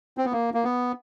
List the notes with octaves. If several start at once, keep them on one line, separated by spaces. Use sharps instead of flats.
C4
B3
A#3
A#3
B3